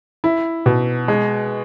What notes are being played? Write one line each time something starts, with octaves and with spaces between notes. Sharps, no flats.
E4
B2
G#3